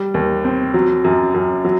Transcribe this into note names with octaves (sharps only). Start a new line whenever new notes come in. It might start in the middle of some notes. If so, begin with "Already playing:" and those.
Already playing: G3
D#2
C4
F#3
F#2
F#2
F#3